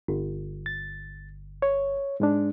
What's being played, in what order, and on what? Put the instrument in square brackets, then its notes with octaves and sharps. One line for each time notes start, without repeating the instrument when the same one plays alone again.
[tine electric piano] G1
[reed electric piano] A6
C#5
G#2 G#3 D4